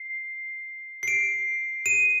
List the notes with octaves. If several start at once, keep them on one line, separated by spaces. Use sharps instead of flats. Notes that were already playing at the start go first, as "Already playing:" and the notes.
Already playing: C7
C7
D7
D#7